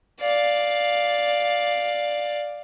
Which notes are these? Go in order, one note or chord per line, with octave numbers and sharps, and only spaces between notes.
D5 F5